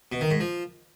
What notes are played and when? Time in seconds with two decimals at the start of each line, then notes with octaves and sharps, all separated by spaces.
0.12 B2
0.21 D#3
0.31 G#2
0.40 F3